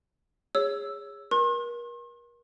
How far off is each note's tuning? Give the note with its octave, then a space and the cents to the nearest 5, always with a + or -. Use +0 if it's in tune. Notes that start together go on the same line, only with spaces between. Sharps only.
G#4 -25 C#5 +0 E6 +0
A#4 +40 C6 +45